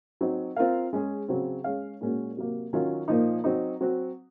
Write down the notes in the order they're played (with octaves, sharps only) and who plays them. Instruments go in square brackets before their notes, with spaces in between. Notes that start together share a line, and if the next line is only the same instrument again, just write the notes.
[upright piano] F#3 C4 D#4
C4 F4 A#4 F5
G#3 C#4 G#4
C#3 F#3 C4
G#3 C#4 G#4 C#5 F5
A#2 G#3 C#4 F#4
C3 F#3 A#3
D#3 F#3 C#4 F4
A#2 F3 A#3 D#4
F#3 C4 D#4
F#3 C4 F#4